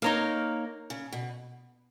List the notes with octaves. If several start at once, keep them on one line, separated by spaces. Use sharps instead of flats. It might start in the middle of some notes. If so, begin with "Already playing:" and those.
A#3 D#4 A#4 C#5 F5
C#3
B2